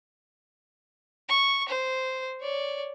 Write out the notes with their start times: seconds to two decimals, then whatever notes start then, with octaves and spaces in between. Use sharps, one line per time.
1.29 C#6
1.69 C5
2.41 C#5 D5